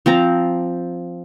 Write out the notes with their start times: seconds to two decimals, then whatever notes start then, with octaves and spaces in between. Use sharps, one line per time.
0.06 F3 C4 A#5